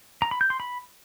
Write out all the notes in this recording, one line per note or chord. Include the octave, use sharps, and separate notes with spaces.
A#5
B5
G6
C6
B5